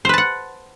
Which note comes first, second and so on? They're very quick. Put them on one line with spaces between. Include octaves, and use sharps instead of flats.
C5 B4 A5 F#5